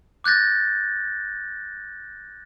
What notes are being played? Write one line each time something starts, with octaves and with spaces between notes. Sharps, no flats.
D6 F#6 G6 A6 A#6